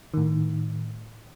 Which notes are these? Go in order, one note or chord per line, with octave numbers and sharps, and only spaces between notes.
A2 D#3